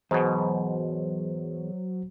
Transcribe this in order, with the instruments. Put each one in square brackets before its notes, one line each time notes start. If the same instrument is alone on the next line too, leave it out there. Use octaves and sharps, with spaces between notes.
[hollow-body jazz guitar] E2 [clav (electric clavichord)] G#2 B2 [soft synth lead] F#3 [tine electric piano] C5